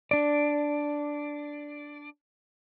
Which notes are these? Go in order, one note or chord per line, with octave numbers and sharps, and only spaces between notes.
D4 D5